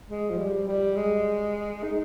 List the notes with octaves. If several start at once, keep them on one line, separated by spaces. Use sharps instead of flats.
G#3
F3
G3
G3
G#3
D#4